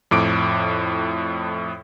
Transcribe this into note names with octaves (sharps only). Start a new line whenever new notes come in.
F2 A2 D6 D7